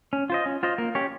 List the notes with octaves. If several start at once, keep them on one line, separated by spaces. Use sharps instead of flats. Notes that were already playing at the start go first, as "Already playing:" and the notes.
C#4
F4 C5 D#5
C#4
F4 C5 D#5
A#3
C#4 G4 C#5